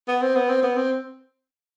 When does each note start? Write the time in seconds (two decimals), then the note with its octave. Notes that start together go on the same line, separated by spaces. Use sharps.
0.08 B3
0.22 C4
0.36 B3
0.49 C4
0.63 B3
0.77 C4